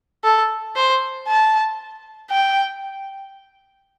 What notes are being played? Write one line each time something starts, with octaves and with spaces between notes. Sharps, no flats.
A4
C5
A5
G5